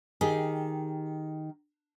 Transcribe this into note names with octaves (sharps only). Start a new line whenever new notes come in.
D#3 G4 G#4